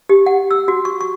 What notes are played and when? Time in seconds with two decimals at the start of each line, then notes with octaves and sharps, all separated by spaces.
0.09 G4
0.26 F#5
0.51 E6
0.68 F#4
0.85 C#6
1.01 C#6